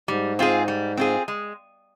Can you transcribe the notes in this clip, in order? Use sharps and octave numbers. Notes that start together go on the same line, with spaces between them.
G#2 G3
C4 F4 G#4
G3
C4 F4 G#4
G#3